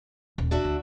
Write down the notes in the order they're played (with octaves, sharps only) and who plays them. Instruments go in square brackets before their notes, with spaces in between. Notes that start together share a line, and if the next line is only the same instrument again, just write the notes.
[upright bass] D#1
[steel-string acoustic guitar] D4 F#4 E5
[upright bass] D2